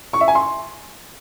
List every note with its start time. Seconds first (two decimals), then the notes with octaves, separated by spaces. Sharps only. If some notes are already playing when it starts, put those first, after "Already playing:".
0.13 C#6
0.21 E5
0.28 G#5
0.35 C6